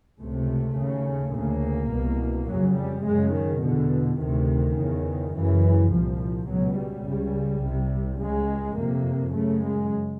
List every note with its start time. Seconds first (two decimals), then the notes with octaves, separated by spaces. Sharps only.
0.19 C#2 C3 A3
0.77 D#2 C#3
1.34 D2 C#3 A#3
1.91 C2 B2
2.48 F2 C#3 F#3
2.76 G3
3.05 F#2 C#3 G#3
3.34 D#3
3.62 E2 B2 D3
4.20 D2 C3 D#3
4.76 E2 C#3
5.33 F#2 C#3 E3
5.91 C2 A#2 F3
6.48 C#2 B2 F#3
6.77 G3
7.06 C#2 C#3
7.62 C2 C3
8.19 C#2 C#3 G#3
8.76 F2 C3 A#3
9.33 F#2 C#3 A3
9.62 G#3